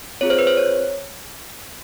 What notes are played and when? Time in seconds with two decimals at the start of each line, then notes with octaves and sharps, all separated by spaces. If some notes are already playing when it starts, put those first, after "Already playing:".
0.21 C4 F4 G#4 C#5
0.30 C5
0.39 B4
0.47 C5
0.57 C#5